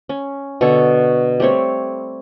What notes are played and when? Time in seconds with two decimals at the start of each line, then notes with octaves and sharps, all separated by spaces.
0.09 C#4
0.61 B2 D3 A4 C#5
1.40 G3 A3 C4 C#5